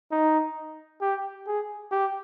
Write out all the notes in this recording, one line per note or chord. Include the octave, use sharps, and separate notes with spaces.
D#4
G4
G#4
G4